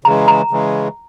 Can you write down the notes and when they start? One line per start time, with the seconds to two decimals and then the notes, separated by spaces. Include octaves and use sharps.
0.04 C#3 E3 G#3 A#5
0.28 A#5
0.51 C#3 E3 G#3